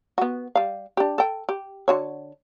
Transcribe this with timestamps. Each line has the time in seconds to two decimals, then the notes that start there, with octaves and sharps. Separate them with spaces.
0.18 B3 F#4
0.55 G3 F5
0.97 D4 G4
1.18 A4 G5
1.49 G4
1.88 D3 F#4 C#5